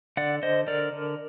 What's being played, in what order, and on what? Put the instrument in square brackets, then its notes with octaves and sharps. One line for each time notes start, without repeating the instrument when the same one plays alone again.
[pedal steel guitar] D3 D5 F#5
D3 C5 D#5
D3 A#4 D5
D3